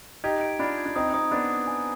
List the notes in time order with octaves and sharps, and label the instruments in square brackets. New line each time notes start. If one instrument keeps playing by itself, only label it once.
[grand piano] D#4 G4 [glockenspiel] G#6
[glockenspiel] D7
[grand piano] D4 F4 [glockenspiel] B5
[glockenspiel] G#6
[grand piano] D4
[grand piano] C4 D#4 [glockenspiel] D#6
[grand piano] C4 D#4 [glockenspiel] D#6
[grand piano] B3 D4 [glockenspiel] D#6
[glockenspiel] D#6
G#5